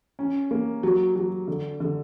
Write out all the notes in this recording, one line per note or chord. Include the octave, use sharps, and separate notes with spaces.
C#4
A#3
F#3
F#3
D3
D3